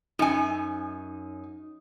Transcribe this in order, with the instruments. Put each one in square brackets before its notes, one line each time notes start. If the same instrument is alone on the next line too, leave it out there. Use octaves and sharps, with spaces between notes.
[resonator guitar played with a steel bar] F#2 G#5 [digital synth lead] D#4